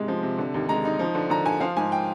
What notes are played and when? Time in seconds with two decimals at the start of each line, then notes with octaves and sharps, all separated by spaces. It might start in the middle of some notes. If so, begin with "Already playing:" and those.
Already playing: G#2 C3 G#3
0.08 F3
0.23 C3
0.38 D3
0.54 D#2
0.69 G#3 A#5
0.85 D#4
0.99 F3
1.15 D3
1.30 D3 A#5
1.45 D3 G#5
1.61 F3 F5
1.77 G#2 G#5
1.92 G5